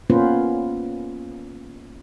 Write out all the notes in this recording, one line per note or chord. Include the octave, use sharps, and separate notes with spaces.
A#3 B3 C#4 F4 B4 C5